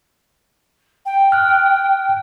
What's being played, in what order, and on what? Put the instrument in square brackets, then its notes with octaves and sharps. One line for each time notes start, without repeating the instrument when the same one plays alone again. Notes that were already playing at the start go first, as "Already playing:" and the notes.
[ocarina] G5
[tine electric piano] F6 F#6